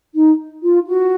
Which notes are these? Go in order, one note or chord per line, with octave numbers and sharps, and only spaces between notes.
D#4
F4
F#4